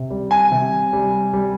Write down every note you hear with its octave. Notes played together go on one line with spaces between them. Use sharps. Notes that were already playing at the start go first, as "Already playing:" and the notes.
Already playing: C3
G3
G#5
C3
G3
G3